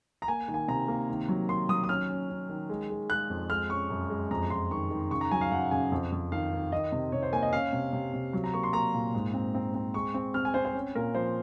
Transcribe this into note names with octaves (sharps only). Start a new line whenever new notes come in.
A#5
A#3 G#5
D#3
G#5
C3 A#5
A#3
D#3
F#3
D#3 C6
F#3 D#6
D#6
C#4 F6
C#4
C#4
D#3
G#3
G#3
G#3 F#6
F2
G#3 F6
C#4 C#6
F#2
G#3
F2 A#5
F2 C6
D#3 C#6
D#3
C#3 C#6
A#5
F#3 G#5
F5
F#2 F#5
C#3 G#5
F2
F2
D#3 F5
D#3
D#3 D#5
C3
C3 C#5
C5
A#3 G#5
D#5
C#4 F5
C3
C3
C3
F#3
A#5
A#3 C#6
C6
A#3 A#5
A#2
G#2
C4
C4
C4
G#3 C#6
C4
C4 F6
G#5
C4 C5
C5
C#4
A#2 A#4
F3 C5